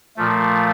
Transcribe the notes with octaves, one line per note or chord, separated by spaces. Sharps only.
A#2 F3 A3